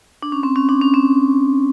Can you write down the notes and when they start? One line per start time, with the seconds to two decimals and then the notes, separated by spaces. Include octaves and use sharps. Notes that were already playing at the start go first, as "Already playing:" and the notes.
0.22 D4
0.32 C#4
0.43 C4
0.56 C#4
0.69 D4
0.81 C#4
0.94 C4